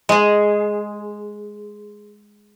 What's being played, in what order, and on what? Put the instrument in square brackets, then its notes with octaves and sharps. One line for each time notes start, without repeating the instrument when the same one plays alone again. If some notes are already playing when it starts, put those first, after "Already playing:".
[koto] G#3 G#4